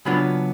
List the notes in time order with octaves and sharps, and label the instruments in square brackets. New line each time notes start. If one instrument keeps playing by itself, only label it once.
[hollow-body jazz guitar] C#3 F#3 B3 D4 F4 B5